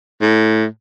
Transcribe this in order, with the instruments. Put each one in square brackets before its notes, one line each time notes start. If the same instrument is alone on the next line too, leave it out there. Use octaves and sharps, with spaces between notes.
[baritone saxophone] A2